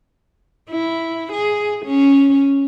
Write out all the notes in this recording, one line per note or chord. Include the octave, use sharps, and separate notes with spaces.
E4
G#4
C#4